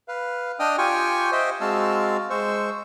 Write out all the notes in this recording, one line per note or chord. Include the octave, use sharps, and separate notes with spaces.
B4 F5
D4 D#5 G5 D#6 F6
F4 G4 G5 G#5 C#6
C5 D#5 E5 G5
G#3 C4 F#4 F5 A5 E6
G#3 C5 C#6 E6